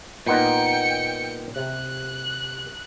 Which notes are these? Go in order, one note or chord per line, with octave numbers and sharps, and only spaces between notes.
A#2 B3 D#4 G5 C#7
C3 F#6